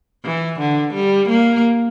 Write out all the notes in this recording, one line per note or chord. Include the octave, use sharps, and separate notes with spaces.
E3
D3
G3
A#3